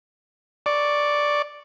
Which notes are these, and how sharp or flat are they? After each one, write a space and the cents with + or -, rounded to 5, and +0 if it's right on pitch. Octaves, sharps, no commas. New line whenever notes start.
D5 +0 C#6 +0